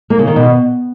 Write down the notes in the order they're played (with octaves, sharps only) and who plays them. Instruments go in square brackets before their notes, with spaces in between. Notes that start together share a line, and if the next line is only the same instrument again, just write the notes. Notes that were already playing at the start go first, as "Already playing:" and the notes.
[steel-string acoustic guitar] A#3
C#3
D#3
B2